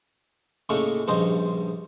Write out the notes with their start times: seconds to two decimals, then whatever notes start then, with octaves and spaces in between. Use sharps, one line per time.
0.69 A2 C#3 A3 A#3 C#4 D#4
1.08 A#1 G2 C#3 C5 D#5